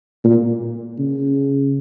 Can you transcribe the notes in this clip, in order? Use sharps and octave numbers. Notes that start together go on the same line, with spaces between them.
A#2
C#3